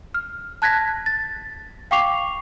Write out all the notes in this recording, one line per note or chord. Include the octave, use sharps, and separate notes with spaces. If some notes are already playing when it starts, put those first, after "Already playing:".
F6
A5 F#6 G#6 A#6 B6
A6
F5 G5 C#6 D6 C7 F7